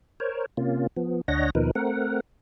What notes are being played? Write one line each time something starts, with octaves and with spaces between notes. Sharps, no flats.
A#4 C5 C#5
C3 A#3 C#4 F4
F3 B3
D2 D4 C#5 D#5 F#5 A#6
D#2 B2 F3 D#4 A#4 B4
A3 C4 A#4 F#5